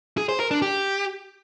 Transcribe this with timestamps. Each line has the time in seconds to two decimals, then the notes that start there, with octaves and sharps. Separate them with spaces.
0.18 G#4
0.29 C5
0.40 A#4
0.51 D4
0.62 G4